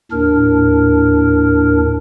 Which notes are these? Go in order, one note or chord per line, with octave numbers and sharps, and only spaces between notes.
D#2 A2 D4 A#4